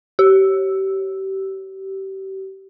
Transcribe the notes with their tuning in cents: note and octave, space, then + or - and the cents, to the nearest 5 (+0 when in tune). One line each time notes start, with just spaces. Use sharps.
G4 -30